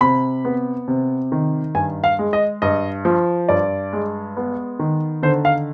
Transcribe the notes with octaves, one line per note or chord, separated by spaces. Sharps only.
C3 B5
B3
C3
D#3
G2 G#5
F5
G#3
D#5
G2 D#5
F3
G2 D5
G#3
B3
D#3
D3 C5
F5